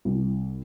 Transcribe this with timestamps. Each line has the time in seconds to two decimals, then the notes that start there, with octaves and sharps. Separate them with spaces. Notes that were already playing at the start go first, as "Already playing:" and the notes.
0.05 C2